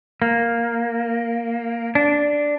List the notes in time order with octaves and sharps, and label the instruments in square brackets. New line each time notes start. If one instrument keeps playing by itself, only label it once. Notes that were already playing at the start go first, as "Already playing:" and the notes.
[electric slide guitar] A#3
D4